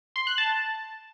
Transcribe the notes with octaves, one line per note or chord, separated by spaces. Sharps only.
C6
F#6
A5